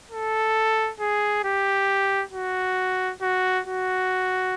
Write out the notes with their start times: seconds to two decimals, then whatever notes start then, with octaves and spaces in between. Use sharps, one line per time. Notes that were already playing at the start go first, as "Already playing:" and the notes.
0.11 A4
1.00 G#4
1.44 G4
2.33 F#4
3.22 F#4
3.67 F#4